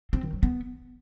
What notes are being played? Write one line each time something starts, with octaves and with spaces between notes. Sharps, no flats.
C4
D#3
F#3
B3